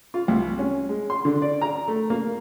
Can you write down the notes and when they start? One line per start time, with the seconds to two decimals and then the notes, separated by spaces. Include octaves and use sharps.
0.14 F4
0.28 C2
0.59 C#4
0.89 G#3
1.10 C6
1.25 D3
1.42 D5
1.61 A#5
1.88 A3
2.10 A#3